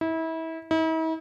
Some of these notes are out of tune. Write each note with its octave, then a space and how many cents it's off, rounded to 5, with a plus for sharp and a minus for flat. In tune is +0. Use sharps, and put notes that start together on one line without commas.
E4 -30
E4 -45